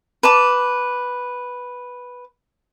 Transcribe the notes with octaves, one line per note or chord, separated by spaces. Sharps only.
B4 A5 D6